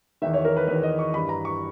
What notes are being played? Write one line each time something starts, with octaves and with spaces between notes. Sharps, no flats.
E2 D#3 E5
C#5
A#4
B4
E2 D#3 B4
D#5
C#6
G2 E3 B5
A#5
C#6